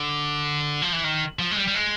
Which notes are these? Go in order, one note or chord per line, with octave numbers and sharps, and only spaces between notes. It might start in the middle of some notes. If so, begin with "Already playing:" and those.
Already playing: D3
F3
E3
D#3
F3
G#3
G3
G3
G#3